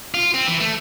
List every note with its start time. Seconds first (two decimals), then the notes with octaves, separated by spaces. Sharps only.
0.14 F4
0.34 C4
0.47 E3
0.60 A3